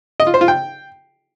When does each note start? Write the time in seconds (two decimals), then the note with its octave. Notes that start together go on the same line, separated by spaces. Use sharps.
0.20 D#5
0.27 F4
0.34 C5
0.41 F4
0.48 G5